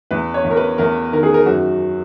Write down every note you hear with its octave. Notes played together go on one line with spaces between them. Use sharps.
E2 B4
C#5
E2
A#4
B4
E2 A#4
D#3 A#4
G#4
A#4
F#2 F#4